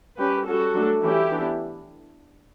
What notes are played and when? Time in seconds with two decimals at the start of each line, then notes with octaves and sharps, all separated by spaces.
0.19 G3 C#4 G4 B4
0.46 G3 C#4 F#4 A4
0.75 F#3 A3 D4
1.03 E3 A3 C#4 E4 G4
1.31 E3 B3 D4